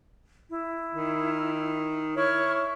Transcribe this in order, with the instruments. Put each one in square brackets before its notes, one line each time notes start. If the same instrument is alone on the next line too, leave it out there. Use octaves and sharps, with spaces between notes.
[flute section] E4
[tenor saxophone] D#3
[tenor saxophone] E4 [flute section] C#5 C#6 F6